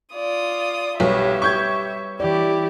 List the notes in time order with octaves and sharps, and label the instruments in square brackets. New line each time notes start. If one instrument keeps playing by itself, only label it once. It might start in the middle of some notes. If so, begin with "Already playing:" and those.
[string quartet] F4 D#6 [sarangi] D5
[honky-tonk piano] B1 [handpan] G3 B4 C#5 [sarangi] G4 [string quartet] E5
[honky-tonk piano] C#6 G6 G#6
[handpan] E3 D5 [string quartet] E4 [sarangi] G4